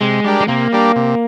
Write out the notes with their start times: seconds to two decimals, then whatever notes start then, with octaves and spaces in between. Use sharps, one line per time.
0.01 C3 G#3
0.24 G3 D4 G4 A#4
0.40 G#3
0.48 C3 A#3
0.73 G3 D4 G4 A#4
0.96 C3